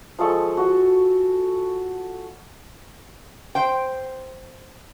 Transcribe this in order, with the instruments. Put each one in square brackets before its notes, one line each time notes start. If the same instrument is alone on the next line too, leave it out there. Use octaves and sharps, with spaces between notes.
[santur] F3 G#3 A4 C#6
F#4
[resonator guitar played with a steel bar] C5 G5